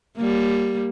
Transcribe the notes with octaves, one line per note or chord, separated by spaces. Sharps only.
G3 A#3